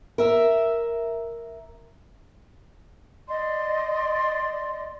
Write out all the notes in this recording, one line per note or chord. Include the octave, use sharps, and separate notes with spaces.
A#4 E5
D5 D#5 C6